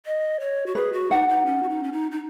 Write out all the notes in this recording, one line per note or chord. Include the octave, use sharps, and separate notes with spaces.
D#5
C#5
F#4
G#4 B4
F#4
D#4 F#5
D#4
C#4
F#4
D#4
C#4
D#4
D#4